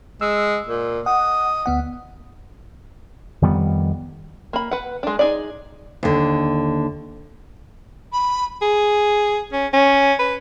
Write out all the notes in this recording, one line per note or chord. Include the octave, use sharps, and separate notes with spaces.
G#3 E6
A#2
D#5 F#5
D2 B3 F#5
F2 D#3 G3 B3
A#3 B5
B4 F#5
G#3 D4
D#4 G#4 D5
D#2 D3
B5
G#4
C#4
C#4
B4